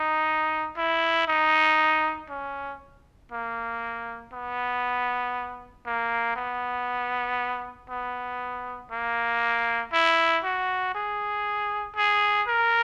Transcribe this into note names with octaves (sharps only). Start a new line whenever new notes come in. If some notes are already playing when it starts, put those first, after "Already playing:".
Already playing: D#4
E4
D#4
C#4
A#3
B3
A#3
B3
B3
A#3
E4
F#4
G#4
G#4
A#4